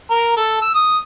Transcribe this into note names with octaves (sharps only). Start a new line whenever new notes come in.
A#4
A4
E6
D#6